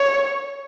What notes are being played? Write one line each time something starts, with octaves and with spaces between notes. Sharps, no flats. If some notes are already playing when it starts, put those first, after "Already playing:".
Already playing: C#5